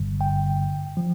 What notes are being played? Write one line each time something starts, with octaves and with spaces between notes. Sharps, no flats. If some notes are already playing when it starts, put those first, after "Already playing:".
Already playing: G1 G2 D3 G3
G5
F3